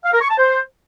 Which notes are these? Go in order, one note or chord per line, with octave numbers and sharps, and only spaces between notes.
F5
A#4
C#6
A5
C5